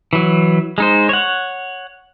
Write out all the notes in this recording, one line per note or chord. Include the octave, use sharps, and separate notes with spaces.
E3 F#3
G#3 D#4 C5
C#5 F#5